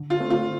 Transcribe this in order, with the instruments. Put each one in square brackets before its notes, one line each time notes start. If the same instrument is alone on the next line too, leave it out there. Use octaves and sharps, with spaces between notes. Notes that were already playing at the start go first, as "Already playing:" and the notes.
Already playing: [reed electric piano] D3
[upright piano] F4
[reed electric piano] A3 C4
[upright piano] F4